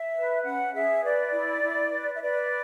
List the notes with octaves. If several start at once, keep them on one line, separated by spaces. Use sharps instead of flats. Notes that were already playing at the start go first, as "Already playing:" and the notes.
Already playing: E5
B4
C#4 F#5
G#4 E5
B4 D5
E4
E4
B4
E5
B4 D5